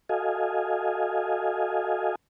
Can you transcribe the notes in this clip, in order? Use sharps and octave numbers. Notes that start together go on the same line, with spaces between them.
F#4 A4 D#5 F5 G#5